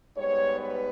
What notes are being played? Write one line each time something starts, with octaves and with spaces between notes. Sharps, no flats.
G#2 G3 B3 C#5
B4